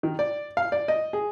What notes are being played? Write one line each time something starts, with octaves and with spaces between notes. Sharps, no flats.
D#3
D5
F5
D5
D#5
G#4